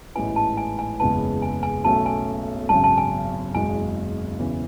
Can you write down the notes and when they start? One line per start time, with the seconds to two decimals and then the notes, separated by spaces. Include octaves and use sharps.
0.15 A1 G#2 G#3 B3 E4 G#5
0.36 A5
0.57 G#5
0.79 G#5
1.00 F#1 E2 C#3 G#3 B3 A5
1.42 G#5
1.63 G#5
1.84 B1 B2 A3 C#4 A5
2.06 G#5
2.69 G#1 F#2 C#3 A5
2.84 A5
2.98 G#5
3.55 F#1 E2 B2 G#3 G#5
4.39 E1 E2 C#3 E3